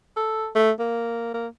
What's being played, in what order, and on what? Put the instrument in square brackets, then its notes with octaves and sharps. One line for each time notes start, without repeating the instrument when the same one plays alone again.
[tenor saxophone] A4
A3
A#3
A#3